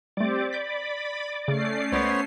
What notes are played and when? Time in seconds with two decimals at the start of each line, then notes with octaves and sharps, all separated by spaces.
0.17 G3 A3 C4 G4 C5 D5
0.53 B5 G6 B6
1.48 C#3 A3 C#4 C7
1.92 C#2 B3 C5 C#5